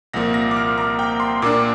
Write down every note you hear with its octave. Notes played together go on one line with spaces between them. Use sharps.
C2 A#2 F3 A#3 A#6
A#6
D6
F6
A#5
G5
C6
A#2 A#3 D4 D6